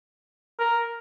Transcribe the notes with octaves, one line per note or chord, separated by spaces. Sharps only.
A#4